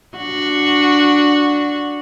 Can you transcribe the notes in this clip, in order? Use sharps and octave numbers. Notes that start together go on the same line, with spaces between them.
D4 F#4